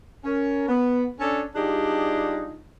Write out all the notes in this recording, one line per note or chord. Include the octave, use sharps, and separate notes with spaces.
C#4 A#4
B3
C#4 D4 A4
G3 D4 D#4 F4 G4 G#4